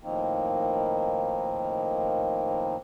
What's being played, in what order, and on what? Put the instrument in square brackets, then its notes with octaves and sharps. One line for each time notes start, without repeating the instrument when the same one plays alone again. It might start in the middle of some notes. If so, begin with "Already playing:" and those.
[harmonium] A2 D#3 F3 A#3 C4 D#4